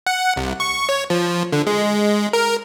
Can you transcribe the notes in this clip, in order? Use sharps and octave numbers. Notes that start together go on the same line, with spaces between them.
F#5
C2
C#6
C#5
F3
D3
G#3
A#4